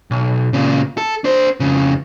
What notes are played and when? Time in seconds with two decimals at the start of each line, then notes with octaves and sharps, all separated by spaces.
0.11 B1
0.53 A#2 C#3
0.98 A4
1.24 D4 C5
1.60 F2 C#3